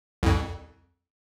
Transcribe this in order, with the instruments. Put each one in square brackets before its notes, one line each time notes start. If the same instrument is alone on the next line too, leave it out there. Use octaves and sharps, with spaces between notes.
[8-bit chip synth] C2 F2